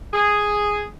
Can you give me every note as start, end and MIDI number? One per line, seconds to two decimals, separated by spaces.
0.14 0.83 68